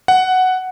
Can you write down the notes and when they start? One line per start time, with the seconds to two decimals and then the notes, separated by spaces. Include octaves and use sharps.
0.08 F#5